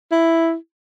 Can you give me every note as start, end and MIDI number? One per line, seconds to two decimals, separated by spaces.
0.12 0.55 64